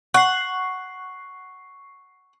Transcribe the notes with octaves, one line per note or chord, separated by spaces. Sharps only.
F#5 C#6 C7